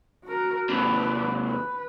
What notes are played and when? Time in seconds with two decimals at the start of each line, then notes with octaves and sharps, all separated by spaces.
0.25 F#4 A#4
0.69 D#2 C3 B4 D5
1.48 B4